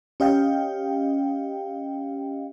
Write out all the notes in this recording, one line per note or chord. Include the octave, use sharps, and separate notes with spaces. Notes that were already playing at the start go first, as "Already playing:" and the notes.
C#4 G4 D#5 F5 G5